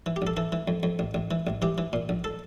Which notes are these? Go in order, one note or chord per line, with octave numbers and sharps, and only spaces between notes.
E3
G4
A#1 A4
E3 A4
E3
F2
F2
A1
A1
E3
A1
E3 G4
E3
A#2
A#1
A4